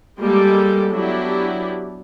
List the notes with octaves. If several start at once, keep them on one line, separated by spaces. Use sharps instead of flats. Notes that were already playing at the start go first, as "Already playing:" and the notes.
G3 G#3 A#3 G4 A4
F#3 B3 D4 E4 G4